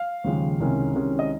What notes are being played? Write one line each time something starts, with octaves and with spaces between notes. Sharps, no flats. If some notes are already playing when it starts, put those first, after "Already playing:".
Already playing: F5
D#2 C#3 F3 G#3
C2 C3 D#3 G#3 C#4
C2 C3 D#3 G#3 C#4
D#5